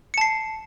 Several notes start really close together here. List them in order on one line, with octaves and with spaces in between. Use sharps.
C#7 A5 C7